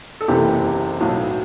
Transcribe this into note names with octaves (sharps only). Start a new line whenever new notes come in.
A4
F#1 E2 C3 E3 G4
B1 A2 F#3